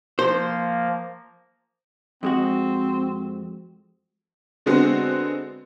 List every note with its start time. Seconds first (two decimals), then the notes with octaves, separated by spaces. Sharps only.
0.19 F3 A#3 C5
2.23 F2 G#3 C4 F#4
4.66 D3 G#3 B3 C4 F#4